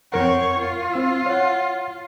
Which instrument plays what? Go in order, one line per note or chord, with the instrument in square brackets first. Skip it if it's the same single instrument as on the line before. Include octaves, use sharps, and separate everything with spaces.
[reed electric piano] F2 A#4 F#5 [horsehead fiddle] C4 C#5
[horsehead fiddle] F4
[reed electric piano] C4 E6
C#5 F#5